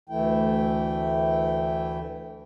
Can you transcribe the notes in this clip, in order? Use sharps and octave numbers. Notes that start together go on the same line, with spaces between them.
D2 E3 A3 E4 G5